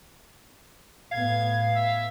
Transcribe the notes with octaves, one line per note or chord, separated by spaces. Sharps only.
A2 B3 F5 G#6
E5